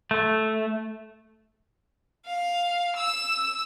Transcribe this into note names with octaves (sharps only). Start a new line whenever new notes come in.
A3
F5
E6